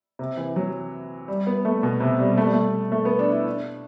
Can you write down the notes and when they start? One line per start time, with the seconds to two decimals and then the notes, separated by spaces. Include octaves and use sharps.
0.19 C3
0.37 E3
0.56 F#3
1.28 G3
1.47 B3
1.65 A3
1.83 B2
2.00 C3
2.19 G3
2.38 A3
2.45 G3
2.53 A3
2.92 A3
3.05 B3
3.19 D4
3.32 E4
3.47 D4